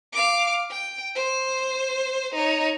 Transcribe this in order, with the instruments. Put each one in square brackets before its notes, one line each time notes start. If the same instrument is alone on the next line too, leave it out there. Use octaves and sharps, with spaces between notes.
[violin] F5 D6
G5
C5
D#4 C#5